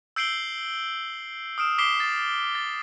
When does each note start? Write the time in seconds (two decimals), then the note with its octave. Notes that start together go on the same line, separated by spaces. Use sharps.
0.16 E6 G6 C7 D7 F#7 G7
1.58 D#6 F6 D7 E7
1.78 D6 B6 C7 D7 E7 G7
2.00 A6
2.55 A6